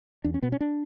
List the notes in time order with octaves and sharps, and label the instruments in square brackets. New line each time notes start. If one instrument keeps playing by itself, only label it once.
[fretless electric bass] E2 D4
C#4
B2 B3
C#4
D4